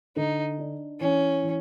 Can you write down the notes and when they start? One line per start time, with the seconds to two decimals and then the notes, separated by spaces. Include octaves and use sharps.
0.16 D3 D#4
0.58 D4
1.00 E3 C#4
1.42 E3